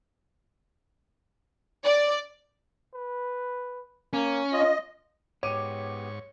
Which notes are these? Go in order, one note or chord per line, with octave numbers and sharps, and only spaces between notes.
D5
B4
A#3 C#4
F4 D#5
G#2 B3 G4 C#5 C#6 D6 D#7